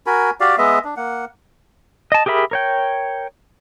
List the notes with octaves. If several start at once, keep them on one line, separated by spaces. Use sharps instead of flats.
F#4 A#4 G#5 B5
F#4 G4 D5 F5
G#3 B3 D#5 E5
D4
A#3 F#5
D#5 A5
G4 G#4 A#4 E5 B5
A#4 C#5 G5